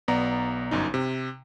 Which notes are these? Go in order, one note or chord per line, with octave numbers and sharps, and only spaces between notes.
B1 B3 D5 A#5
G1 F#2 D#4
C3